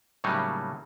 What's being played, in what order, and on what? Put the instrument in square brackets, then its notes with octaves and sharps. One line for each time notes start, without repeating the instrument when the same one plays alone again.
[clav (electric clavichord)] A2 C#3 F#3 G3 A#3 D#4